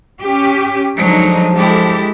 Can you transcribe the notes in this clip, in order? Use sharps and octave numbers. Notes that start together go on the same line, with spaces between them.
C#4 G4
D3 F3 F#3 G#3 D#4
G#3 E4 G4 A4